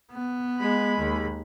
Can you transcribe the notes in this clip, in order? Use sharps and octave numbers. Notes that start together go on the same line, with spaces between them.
B3
G#3 B5
D#2